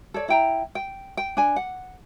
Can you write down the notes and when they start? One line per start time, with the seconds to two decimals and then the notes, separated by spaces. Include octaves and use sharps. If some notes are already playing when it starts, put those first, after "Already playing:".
0.14 A4 C#5 D5
0.29 E4 G5 A#5
0.75 G5
1.17 G5
1.37 D4 G#5
1.56 F#5